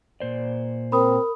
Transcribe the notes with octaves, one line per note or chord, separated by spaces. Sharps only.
A#2 C5 D5
C4 A#4 B5 D#6